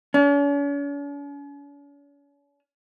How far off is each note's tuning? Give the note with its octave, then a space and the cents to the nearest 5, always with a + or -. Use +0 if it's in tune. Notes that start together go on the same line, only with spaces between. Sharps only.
C#4 +45